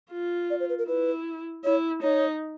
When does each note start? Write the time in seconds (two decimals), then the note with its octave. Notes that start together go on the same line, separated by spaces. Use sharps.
0.11 F4
0.50 D5
0.60 C5
0.69 B4
0.78 A#4
0.88 E4 B4
1.64 E4 C#5
2.02 D#4 C#5